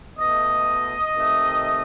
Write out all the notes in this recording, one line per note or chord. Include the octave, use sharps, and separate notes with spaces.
B2 A3 D#5
C3 D#3 A3